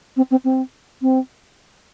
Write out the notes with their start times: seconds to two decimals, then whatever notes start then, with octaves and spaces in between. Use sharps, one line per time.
0.17 C4
0.31 C4
0.44 C4
1.02 C4